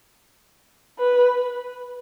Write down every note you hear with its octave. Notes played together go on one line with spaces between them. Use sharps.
B4